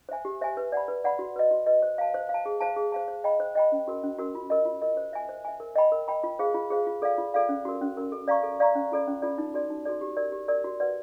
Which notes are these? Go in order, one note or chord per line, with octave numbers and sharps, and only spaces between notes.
C5 E5 G#5
G4
C5 E5 G#5
B4
D5 F#5 B5
B4
D5 F#5 B5
F#4
B4 D#5
F#4
B4 D#5
C5
F5 A5
C5
F5 A5
G#4
C5 F5 A5
G#4
C5 F5 A5
C5
D#5 G5 B5
C5
D#5 G5 B5
C#4
F#4 A#4
C#4
F#4 A#4
F4
A#4 D#5
F4
A#4 D#5
C5
E5 G#5
C5
E5 G#5
A#4
D#5 G5 B5
A#4
D#5 G5 B5
F4
G#4 C5 F5
F4
G#4 C5 F5
F4
A4 D5 F5
F4
A4 D5 F5
C#4
F#4 A#4
C#4
F#4 A#4
A4
D5 F5 A#5 C#6
A4
D5 F5 A#5 C#6
C#4
F4 A4 D5
C#4
F4 A4 D5
D#4
F#4 A4 D5
D#4
F#4 A4 D5
G4
A#4 D5
G4
A#4 D5
F#4
B4 D5 F#5